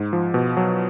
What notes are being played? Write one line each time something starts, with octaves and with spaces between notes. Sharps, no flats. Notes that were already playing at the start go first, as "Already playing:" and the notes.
Already playing: G#2
F3
B2
F#3